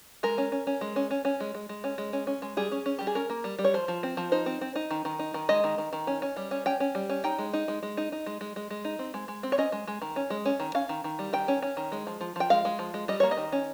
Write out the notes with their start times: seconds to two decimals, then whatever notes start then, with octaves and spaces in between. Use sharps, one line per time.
0.23 G#3 A#4
0.38 C#4
0.52 C#4
0.67 C#4
0.81 G#3
0.96 C#4
1.11 C#4
1.25 C#4
1.40 G#3
1.55 G#3
1.69 G#3
1.84 C#4
1.98 G#3
2.13 C#4
2.27 C#4
2.42 G#3
2.57 G3 G#4
2.72 C#4
2.86 C#4
2.99 G3 G4
3.07 G#4
3.15 C#4 A#4
3.30 A#3
3.44 G3
3.59 G3
3.64 C#5
3.74 F3 C5
3.88 F3
4.03 C4
4.17 F3
4.32 D#4 C5
4.46 C4
4.61 C4
4.76 D#4
4.91 D#3
5.05 D#3
5.19 D#4
5.34 D#3
5.49 G#3 D#5
5.64 D#3
5.78 D#3
5.93 D#3
6.07 C#4
6.22 C#4
6.37 G3
6.51 C#4
6.66 C#4 G5
6.80 C#4
6.95 G3
7.09 C#4
7.24 D#4 G5
7.38 G#3
7.53 D#4
7.68 G#3
7.83 G#3
7.97 D#4
8.12 D#4
8.26 G#3
8.41 G#3
8.56 G#3
8.70 G#3
8.85 D#4
8.99 C4
9.14 G#3
9.28 G#3
9.43 C4
9.52 C#5
9.58 C#4 D#5
9.72 G#3
9.87 G#3
10.02 D#3
10.16 C#4
10.30 G#3
10.45 C#4
10.60 D#3
10.75 C#4 F5
10.89 D#3
11.04 D#3
11.19 G3
11.33 D#3 G5
11.48 C#4
11.62 C#4
11.77 D#3
11.92 G#3
12.07 F3
12.21 F3
12.36 F3 G5
12.50 G#3 F5
12.65 G#3
12.79 F3
12.94 G#3
13.08 G3 D#5
13.20 A#3 C#5
13.31 D#5
13.37 D#3
13.52 C#4